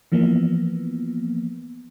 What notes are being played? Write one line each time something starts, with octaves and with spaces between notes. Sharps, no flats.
E3 F3 A#3 B3